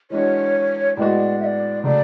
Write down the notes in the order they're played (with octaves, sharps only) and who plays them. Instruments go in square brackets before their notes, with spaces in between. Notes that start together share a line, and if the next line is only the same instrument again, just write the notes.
[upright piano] E3 G#3 D4 F#4 [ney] C#5
[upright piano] A2 G#3 B3 F#4 [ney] D5
[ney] E5
D5
[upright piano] C#3 F#3 A3 [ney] D5